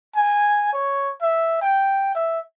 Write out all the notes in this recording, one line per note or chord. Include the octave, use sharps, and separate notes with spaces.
G#5
C#5
E5
G5
E5